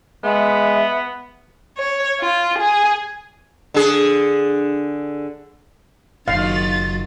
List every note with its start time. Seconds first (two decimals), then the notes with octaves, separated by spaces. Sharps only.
0.24 G#3 B3 E5
1.78 C#5
2.20 F4
2.58 G#4
3.74 D3 G#4
6.28 F#1 D#3 F#3 F4 F5 A6